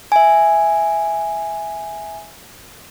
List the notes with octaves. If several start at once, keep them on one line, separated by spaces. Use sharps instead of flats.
E5 G#5